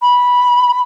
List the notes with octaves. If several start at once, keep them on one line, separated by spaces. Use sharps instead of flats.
B5